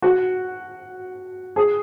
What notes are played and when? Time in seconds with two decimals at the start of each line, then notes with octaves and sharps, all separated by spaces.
0.02 F#4
1.56 G#4